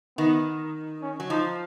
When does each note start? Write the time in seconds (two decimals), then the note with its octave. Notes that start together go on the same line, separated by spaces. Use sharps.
0.18 D#3 B3
1.02 C#4
1.20 F#3
1.30 F3 D#4